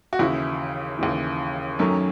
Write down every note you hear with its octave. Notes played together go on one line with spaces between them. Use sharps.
F#4
D#2 C#3 E3 E4
D#2 C#3 E3
F#2 D#3 F#3 A3 C#4